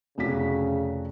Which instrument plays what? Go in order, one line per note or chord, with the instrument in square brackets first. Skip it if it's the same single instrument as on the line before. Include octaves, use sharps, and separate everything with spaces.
[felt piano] F1 F#4 B6 [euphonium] C#3